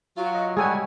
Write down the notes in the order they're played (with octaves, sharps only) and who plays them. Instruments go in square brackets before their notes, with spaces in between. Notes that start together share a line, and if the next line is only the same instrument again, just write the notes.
[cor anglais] F#3 [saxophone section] F4 F#4
[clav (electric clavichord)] D#5
[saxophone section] G3 [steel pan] G#3 G#5 [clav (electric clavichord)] G#4 A4 F#5 [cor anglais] C#5